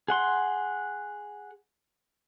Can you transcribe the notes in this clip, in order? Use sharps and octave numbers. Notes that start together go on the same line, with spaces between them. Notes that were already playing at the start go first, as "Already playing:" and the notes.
G#4 F#5 C6